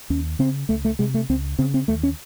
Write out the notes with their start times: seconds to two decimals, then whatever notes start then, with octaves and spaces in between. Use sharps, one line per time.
0.10 D#2 C#4
0.39 C#3 C4
0.69 C#2 A3
0.85 A3
0.99 C3 G#3
1.14 A3
1.29 C#2 C4
1.59 C#3 C4
1.74 C4
1.88 D#2 A3
2.03 C#4